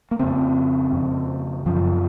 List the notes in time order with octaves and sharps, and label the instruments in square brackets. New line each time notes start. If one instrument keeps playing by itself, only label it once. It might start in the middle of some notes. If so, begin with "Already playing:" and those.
[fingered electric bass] A#3
F2 C#3 C4
F2 C#3
F#2 C#3 F3